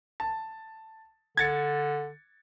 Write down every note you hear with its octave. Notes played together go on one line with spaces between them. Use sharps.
A5
D3 G#6 A6 C#7